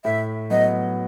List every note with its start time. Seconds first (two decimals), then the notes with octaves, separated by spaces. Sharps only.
0.04 A2 E5
0.50 F#3 B3 D#5